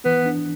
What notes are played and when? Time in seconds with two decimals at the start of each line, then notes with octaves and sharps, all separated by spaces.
0.05 E3 B3
0.26 D4